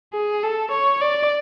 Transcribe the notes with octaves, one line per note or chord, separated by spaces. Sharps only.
G#4
A4
C#5
D5